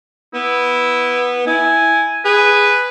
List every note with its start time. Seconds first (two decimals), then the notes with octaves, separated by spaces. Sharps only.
0.34 B3 E4
1.47 E4 G#5
2.25 G#4 B4